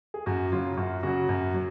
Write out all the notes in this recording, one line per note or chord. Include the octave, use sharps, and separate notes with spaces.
G#4
F#2 F#4
C#3 F#3 F4
F#2 F#4
C#3 F#3 F#4
F#2
F#3